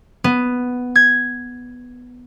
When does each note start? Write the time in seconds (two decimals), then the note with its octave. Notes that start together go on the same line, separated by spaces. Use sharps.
0.24 B3
0.96 G#6